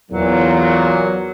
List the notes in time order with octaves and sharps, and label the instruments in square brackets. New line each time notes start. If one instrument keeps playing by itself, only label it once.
[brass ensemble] E2 [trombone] A#2 [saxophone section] F#3